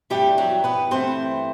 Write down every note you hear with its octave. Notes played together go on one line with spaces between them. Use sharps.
G2 E3 G3 A3 G4
F#3 F#4
B3 B4
G2 E3 A3 C4 C5